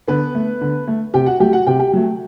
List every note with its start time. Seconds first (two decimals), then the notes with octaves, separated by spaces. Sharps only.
0.08 D3 B3 B4
0.35 A3
0.61 D3
0.88 A3
1.14 C3 G4 G5
1.26 F#4 F#5
1.40 F#3 A3 G4 G5
1.53 F#4 F#5
1.67 C3 G4 G5
1.79 G4 G5
1.93 F#3 A3